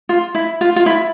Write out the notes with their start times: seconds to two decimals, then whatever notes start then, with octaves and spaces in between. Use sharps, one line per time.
0.09 F4
0.35 E4
0.61 F4
0.76 F4
0.86 E4